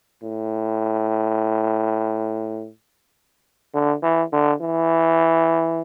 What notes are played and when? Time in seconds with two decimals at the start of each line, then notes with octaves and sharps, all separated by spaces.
0.23 A2
3.74 D3
4.03 E3
4.32 D3
4.61 E3